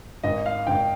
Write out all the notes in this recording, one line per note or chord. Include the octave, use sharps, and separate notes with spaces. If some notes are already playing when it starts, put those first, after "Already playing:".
G#1 D#5
F5
G#1 G5